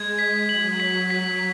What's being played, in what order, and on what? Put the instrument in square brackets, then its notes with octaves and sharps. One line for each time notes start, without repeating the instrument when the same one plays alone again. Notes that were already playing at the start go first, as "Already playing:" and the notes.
Already playing: [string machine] G#3 [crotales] G#6
[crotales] B6
[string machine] F#3 [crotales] F#7
[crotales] B6
B6